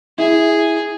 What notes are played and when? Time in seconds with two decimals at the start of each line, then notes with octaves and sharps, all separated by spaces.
0.18 E4 G#4